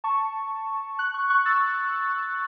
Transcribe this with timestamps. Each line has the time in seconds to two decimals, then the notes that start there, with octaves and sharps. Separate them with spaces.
0.04 A5 C#6
0.98 C#6 F#6
1.14 C#6 F#6
1.30 C#6 F#6
1.45 E6 A6